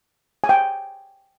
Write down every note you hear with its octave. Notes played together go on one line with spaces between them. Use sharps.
G#5
G5